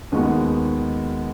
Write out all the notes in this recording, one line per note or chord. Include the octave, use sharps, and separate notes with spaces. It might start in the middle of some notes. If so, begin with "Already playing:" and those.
D#2 D#3 G#3 B3 F#4